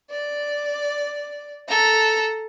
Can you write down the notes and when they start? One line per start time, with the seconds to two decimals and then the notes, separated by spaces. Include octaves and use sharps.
0.10 D5
1.68 A4 A#5